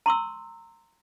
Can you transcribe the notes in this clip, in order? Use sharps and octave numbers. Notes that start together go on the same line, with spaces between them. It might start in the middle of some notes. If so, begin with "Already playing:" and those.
A#5 C6 C#6 E6